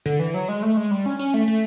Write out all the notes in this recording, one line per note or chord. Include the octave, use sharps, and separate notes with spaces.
D3
E3
F#3
G#3
A3
G#3
G3
C#4
C#4
A3
A3